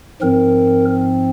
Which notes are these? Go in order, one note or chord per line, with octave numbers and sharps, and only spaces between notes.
G#2 F3 C4 A#4